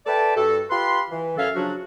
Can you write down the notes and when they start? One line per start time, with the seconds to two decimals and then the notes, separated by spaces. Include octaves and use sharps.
0.06 A4 B4 D5 E5 G5 A5
0.36 G2 F#4 A4
0.70 F4 G4 B4 B5 C6
1.10 E3
1.38 F#2 F#3 C#4 A4 E5 F5
1.55 C#3 F3 F#3 D4 F#4